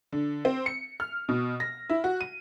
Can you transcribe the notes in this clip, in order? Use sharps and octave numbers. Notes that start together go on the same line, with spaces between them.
D3
C4
C#7
F6
B2
A#6
E4
F#4
D#7